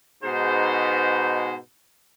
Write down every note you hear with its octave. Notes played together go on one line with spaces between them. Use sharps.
G#2 B2 C5